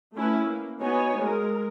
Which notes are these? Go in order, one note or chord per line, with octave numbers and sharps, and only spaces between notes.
A3 C#4 E4 B4
A#3
B3 D#4 F#4 C#5 G#5
G#3 A#4